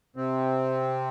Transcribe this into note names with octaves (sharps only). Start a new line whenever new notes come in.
C3 C4